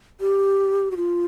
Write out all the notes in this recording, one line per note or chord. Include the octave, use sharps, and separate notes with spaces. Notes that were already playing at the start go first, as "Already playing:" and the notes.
G4
F#4
F4